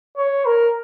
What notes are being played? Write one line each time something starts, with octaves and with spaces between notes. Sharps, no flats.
C#5
A#4